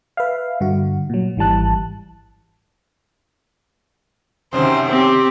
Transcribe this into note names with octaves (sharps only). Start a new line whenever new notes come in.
B4 E5 F5
G2 D3 F#4
A#2 F#3
G#1 E3 G3 A5 F#6
F#2 C3 D#3 C5
C4 G4